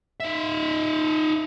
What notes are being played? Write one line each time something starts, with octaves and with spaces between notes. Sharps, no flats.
D#4 E5